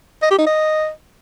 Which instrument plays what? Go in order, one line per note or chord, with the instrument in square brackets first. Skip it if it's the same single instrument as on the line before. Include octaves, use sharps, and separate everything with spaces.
[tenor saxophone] D#5
G4
D#4
D#5